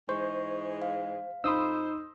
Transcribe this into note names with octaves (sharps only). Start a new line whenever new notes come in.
G#2 E3 G#3 C5 C#6
F5
F2 D#4 C5 B5 C6 D#6 E6